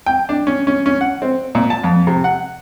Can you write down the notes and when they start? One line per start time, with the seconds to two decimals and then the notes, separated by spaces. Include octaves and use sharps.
0.06 G5
0.29 D4
0.47 C#4
0.67 C#4
0.86 C#4
1.01 F#5
1.22 C4
1.55 A#2
1.70 A5
1.84 F2
2.07 C3
2.24 F#5